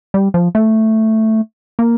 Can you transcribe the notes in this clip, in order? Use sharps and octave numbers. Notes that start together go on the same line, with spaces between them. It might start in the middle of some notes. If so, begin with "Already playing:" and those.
G3
F3
A3
A#3